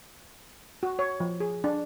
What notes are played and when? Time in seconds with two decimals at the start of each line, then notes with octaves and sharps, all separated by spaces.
0.83 F#4
0.99 C#5
1.20 F3
1.40 G#4
1.64 D4